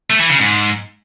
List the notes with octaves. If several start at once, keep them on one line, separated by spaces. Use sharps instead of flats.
A3
E3
C#3
G#2